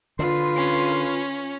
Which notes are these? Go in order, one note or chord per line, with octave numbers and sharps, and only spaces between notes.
D3 F4 B4 C6
C#4